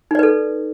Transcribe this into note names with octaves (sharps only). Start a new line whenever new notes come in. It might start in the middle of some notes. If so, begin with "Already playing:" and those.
D#4 A4 B4 D5